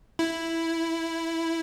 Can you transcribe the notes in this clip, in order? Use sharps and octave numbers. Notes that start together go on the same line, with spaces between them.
E4